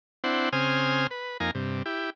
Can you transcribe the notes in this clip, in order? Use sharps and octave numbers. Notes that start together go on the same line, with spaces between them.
C4 D4 E4 C5 F#5
C#3 C4 C5 G#5 D#6 F6
B4
F2 A#3 D#4 F5 G#5 A#5
G2 C3
E4 G4